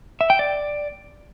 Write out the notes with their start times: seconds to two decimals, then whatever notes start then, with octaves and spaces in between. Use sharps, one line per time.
0.21 E5
0.30 G5
0.39 D5